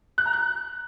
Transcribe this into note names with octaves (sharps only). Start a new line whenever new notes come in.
F#6
A#5
F#6